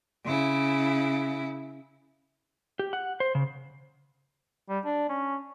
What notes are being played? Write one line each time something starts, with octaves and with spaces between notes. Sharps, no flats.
C#3 E4
G4
F#5
C5
C#3
G3
D4
C#4